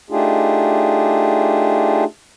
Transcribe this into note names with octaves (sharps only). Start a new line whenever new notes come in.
A3 D4 D#4 F4 G4 G#4